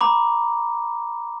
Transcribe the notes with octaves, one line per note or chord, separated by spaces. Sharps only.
A#5 B5 D6